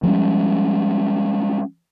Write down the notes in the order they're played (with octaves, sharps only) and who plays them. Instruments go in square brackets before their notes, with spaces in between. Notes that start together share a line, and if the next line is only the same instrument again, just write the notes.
[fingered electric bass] F3 G3 G#3 C#4